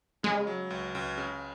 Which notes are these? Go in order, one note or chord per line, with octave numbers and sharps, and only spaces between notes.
C#3 G#3
F#3
C#2
C#2
C#3